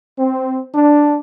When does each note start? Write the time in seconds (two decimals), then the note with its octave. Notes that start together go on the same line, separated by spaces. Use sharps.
0.18 C4
0.74 D4